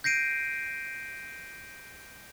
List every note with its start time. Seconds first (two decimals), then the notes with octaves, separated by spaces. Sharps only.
0.04 G6 A#6 C7 D7 D#7